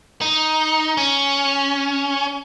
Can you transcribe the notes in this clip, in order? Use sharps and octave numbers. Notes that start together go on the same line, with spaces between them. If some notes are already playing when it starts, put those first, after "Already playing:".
D#4
C#4